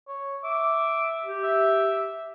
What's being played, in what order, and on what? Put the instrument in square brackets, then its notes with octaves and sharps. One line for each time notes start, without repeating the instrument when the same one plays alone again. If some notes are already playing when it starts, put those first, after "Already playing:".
[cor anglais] C#5
[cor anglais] E5 [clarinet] D6
[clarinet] G4
[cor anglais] E5